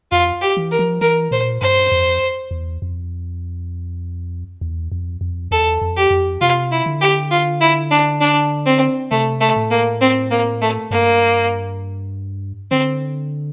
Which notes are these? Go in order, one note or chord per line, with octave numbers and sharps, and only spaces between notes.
F2 F4
G4
E3
A#4
F3
E3 A#4
A#2 C5
G2 C5
F2
E2
F2
E2
F2
F2
E2 A4
F2
G4
F2
C3 F4
E4
D3
G4
F4
E4
D4
D4
C4
C3 A3
A3
A2
A#3
C4
A#3
A3
G2 A#3
D3 C4